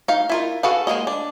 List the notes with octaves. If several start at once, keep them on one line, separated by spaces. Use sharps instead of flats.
D#4 F5
E4 F4 A#4
F#4 G#4 A4 B4 F5
G#3 A#3 A#4 D#5
D4